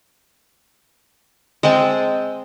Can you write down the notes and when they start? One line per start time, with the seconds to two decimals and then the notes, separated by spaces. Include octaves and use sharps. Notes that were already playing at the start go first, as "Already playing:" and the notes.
1.63 G#3 C4 G5 A5